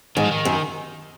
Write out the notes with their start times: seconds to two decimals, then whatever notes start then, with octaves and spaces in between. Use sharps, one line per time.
0.17 G#2 D#3
0.24 F3
0.31 D#3
0.45 F#2